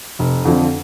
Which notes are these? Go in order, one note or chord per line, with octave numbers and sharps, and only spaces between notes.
F1
F2 D3 F3